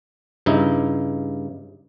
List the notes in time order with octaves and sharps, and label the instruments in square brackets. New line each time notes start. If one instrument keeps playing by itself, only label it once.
[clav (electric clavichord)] G2 C#3 D#4 E4